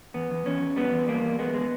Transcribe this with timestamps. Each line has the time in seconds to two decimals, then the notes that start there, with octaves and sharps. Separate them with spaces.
0.14 E2 B3
0.31 E2
0.46 E2 C#4
0.61 E2
0.76 G3 B3
0.93 E2
1.08 G3 A#3
1.23 E2
1.39 G#3 B3
1.54 G#3